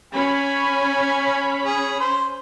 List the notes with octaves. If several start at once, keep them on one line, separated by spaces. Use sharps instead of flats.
C#4 G#5 B5
G#4
C5